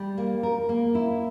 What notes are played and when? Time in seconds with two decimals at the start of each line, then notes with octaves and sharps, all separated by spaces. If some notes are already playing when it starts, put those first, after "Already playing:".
Already playing: G3
0.18 A#3
0.43 A#4
0.69 A#3
0.95 E4